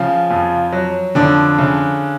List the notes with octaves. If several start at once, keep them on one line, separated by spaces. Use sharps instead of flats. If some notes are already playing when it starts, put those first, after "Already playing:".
Already playing: C#3 F3 F4
F2
F#3
F2 D3 D4
C#3